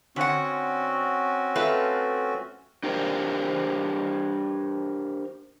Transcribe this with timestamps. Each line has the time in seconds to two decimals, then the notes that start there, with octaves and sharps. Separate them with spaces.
0.16 D3 C4 C#4 F#4 F#5
1.55 A3 F4 B4
2.83 D4 G4 A#4 C5